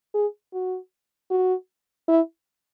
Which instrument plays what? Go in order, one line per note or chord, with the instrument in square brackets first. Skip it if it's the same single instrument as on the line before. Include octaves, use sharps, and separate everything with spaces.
[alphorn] G#4
F#4
F#4
E4